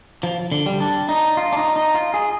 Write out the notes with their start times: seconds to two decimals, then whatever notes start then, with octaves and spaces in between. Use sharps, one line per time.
0.23 F3
0.52 D3
0.66 G3
0.80 D4
1.09 D#4
1.37 F4
1.52 D4
1.57 D#4
1.76 D#4
1.94 F4
2.14 G#4